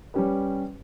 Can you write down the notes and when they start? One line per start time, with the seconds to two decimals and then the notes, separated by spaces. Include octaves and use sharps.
0.14 G3 C#4 G4 B4